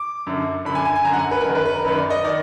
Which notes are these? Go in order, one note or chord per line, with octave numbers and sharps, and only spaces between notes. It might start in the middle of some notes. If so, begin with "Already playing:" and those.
Already playing: D6
F#2 D3
F#2 D3 B5
G#5
G#5
G#5
F#2 D3 A#5
F#5
G#5
B4
A#4
F#2 D#3 B4
B4
B4
A#4
F#2 D#3 B4
D5
D#5
D#3 D5